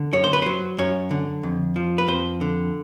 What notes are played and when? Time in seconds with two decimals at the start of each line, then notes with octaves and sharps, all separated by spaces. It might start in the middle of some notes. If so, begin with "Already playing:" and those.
Already playing: D3
0.13 F#2 C#5
0.24 C5
0.33 B4
0.42 F#3 C5
0.78 F#2 C#5
1.11 D3
1.43 F2
1.76 F3
1.98 B4
2.08 F2 C5
2.41 D3